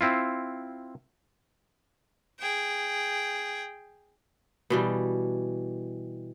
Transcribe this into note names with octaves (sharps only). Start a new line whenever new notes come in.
C4 E4 F4
G#4 G5
B2 E3 G3